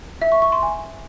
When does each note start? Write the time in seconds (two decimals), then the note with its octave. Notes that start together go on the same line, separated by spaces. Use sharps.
0.22 E5
0.32 C#6
0.42 C#6
0.52 C6
0.63 G#5